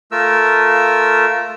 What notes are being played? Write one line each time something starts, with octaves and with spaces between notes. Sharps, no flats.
A3 F4 A#4 E6